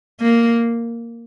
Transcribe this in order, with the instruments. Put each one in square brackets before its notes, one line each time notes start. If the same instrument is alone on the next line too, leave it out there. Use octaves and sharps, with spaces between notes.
[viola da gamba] A#3